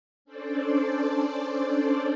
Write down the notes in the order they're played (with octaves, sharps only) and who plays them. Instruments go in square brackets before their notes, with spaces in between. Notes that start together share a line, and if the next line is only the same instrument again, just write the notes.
[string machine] C#4 D4 A4 C5 D5